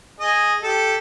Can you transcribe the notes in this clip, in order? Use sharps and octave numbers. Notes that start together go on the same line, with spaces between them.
G#4 D#5
G4 A4